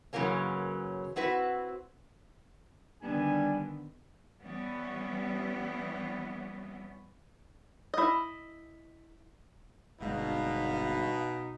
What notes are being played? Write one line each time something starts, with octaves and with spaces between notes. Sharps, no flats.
F#2 C#3 E3 F#3 A#3 C#4
C4 E4 F#4 B4
D3 D#3 G3 B3 D4 G#5
E3 G3 B3 C#4
E4 D#5
G1 B2 G#3 D#4 F5